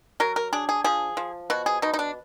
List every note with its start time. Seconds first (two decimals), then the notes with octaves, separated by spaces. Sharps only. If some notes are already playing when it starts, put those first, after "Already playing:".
0.20 F#3 A#4
0.36 A#4
0.53 D4 G#4
0.69 G#4
0.84 F3 G#4
1.17 F3
1.50 B2 F#4
1.66 G#4
1.82 B2 D#4
1.94 D#4
1.99 D4